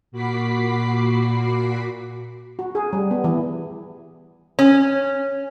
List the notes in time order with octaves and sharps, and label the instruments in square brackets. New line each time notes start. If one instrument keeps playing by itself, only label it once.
[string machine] A#2 F#4 B5 D6 B6 C7
[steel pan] F#4
G#4
G3
B3
E3
[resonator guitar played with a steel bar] C#4